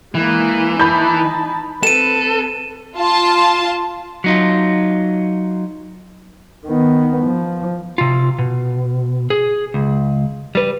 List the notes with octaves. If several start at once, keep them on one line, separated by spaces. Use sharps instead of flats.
E3 G#3 A#3
D#4 A5 B5 G6
C4 A4 B4 D#7 E7
F4 A5
F#3 D#4 F4
D#3 B3
F3
C3 F4
B2
G#4
C#2
G3 B4